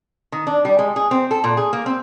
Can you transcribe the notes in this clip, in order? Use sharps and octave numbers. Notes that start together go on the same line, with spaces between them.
D#3
D4
G3
G#3
G#4
C4
A4
A#2
G#4
A#3
C4